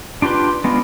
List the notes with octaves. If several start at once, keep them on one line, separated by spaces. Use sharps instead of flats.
D4 F4 G4 B4 C6
G#3 B3 D4 F4